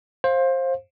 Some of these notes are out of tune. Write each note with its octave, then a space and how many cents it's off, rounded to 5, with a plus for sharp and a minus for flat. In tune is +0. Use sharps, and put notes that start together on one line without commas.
C5 +20 F5 +5